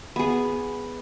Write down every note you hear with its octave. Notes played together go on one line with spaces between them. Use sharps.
B3 G#4